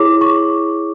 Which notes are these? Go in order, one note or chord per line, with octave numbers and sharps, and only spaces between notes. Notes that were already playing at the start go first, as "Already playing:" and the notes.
Already playing: E4 G#4 C#5 D6
C#6